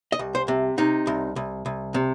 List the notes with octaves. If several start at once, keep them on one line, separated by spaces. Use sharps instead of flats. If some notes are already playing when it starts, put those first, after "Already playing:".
D#5
C2
C5
C3
C3 D#4
C2
C2
C2
C3